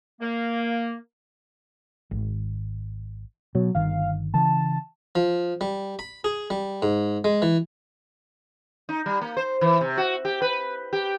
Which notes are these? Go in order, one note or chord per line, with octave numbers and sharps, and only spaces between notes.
A#3
G#1
B2 F#3
G1 D#3 F5
C#3 E3 A5
F3
G3
B5
G#4
G3
G#2
G#3
E3
D#4
G3
A#3
C5
E3
C3
F#4
G4
B4
G4